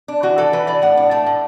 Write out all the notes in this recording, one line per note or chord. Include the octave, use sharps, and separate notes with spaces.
D4
E3 F#4
E3 A4
E3 B4
E3 D5
A2 F#5
D4
A3 A5
A2